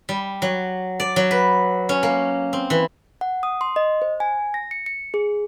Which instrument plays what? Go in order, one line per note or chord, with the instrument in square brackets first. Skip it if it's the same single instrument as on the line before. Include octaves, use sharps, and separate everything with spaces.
[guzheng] G3
F#3
D5
F#3
B4
C#4
A#3
C4
E3
[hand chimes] F#5
D#6
C6
D#5
C5
G#5
A#6
C#7
C#7
G#4